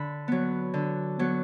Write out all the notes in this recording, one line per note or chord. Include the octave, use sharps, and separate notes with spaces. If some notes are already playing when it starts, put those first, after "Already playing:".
Already playing: D3 B5
F#3 B3
D3
F#3 B3